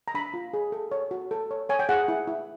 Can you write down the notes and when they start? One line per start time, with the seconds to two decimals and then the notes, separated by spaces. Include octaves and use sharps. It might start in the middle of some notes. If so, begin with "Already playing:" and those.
0.08 A#5
0.14 D4 B5
0.34 F4
0.54 G#4
0.72 A4
0.92 C#5
1.11 F#4
1.31 A4
1.51 C#5
1.69 C#5 G#5
1.79 G5
1.89 G#4 F#5
2.08 E4
2.27 E4